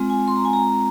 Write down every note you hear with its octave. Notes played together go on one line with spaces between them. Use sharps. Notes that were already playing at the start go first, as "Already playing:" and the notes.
Already playing: G#3 C4 F4
G#5
C6
A#5
G#5
A#5